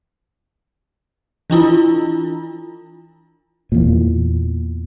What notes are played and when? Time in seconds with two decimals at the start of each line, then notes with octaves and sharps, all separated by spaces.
1.50 E3 D4 E4 F4
3.72 E2 A#2